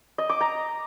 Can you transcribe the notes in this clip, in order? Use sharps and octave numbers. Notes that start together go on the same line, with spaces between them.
D#5
D6
A#5